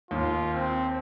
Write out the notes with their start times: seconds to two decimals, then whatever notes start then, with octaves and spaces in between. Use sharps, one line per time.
0.11 D#2 F4
0.54 C4